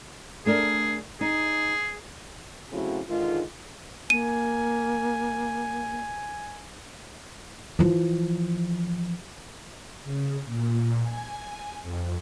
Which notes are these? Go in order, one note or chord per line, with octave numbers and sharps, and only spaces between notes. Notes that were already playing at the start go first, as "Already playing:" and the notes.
A3 D4 G#4 A#4
D#4 G#4
C#3 F#3 A3 C4 E4 F#4
G#2 D3 D#3 G#3 F4
A#3 G#5 D#7
E3 F3
C#3
A#2
G#5
F2